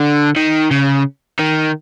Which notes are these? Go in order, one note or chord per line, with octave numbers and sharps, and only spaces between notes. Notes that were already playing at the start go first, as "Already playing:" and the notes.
Already playing: D3
D#3
C#3
D#3